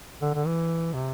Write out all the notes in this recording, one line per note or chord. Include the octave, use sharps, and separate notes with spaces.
D3
D3
E3
C3